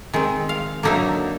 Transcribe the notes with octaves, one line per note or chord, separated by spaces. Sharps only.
D#3 G#3 C4
F5
D3 F#3 A#3 D#4 E5